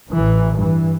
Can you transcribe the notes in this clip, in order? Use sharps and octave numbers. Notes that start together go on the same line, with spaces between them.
A1 E3
G2 E3